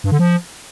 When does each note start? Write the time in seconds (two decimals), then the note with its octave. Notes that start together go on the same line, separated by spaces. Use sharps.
0.04 G2
0.12 D3
0.19 F3